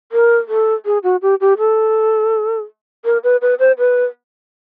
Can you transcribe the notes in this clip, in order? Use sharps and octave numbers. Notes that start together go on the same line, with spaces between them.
A#4
A4
G#4
F#4
G4
G4
A4
A#4
B4
B4
C5
B4